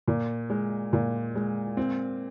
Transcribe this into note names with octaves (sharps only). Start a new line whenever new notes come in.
A#2
G#3
A#2
G#3
C4